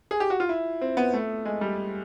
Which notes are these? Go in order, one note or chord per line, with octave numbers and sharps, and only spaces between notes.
G#4
G4
F#4
F4
E4
C4
B3
A3
G#3
G3